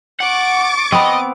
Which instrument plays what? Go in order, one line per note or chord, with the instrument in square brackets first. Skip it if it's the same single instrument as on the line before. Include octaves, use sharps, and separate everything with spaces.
[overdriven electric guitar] F#5 [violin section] C#6 D6 A6
[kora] B3 C4 [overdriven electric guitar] D#5